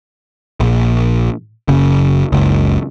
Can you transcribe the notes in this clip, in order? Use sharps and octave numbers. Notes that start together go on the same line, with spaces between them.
A#1
F#1 C#3
F#1 C#2